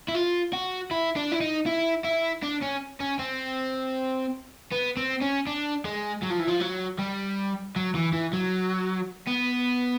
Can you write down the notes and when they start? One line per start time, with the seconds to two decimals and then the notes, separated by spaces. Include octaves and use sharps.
0.08 E4
0.15 F4
0.53 F#4
0.91 E4
1.16 D4
1.32 E4
1.41 D#4
1.66 E4
2.04 E4
2.43 D4
2.62 C#4
3.00 C#4
3.19 C4
4.72 B3
4.97 C4
5.22 C#4
5.47 D4
5.85 G#3
6.23 F#3
6.31 F3
6.40 E3
6.48 F3
6.61 F#3
6.99 G3
7.76 F#3
7.95 E3
8.13 E3
8.33 F#3
9.27 B3